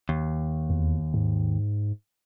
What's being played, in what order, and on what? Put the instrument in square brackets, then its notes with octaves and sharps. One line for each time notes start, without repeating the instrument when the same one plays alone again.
[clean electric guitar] D#2
[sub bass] E2
G#2